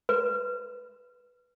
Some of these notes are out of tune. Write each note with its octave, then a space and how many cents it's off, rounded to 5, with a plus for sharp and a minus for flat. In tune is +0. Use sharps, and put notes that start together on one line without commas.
B4 -5